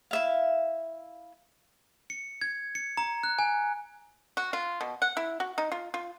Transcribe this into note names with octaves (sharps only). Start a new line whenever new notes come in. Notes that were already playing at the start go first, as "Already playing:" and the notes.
E4 E5 F5
C#7
G#6
C#7
A#5
F#6
G#5
F#4
F4
B2
F#5
E4
F#4
D#4
F4
F4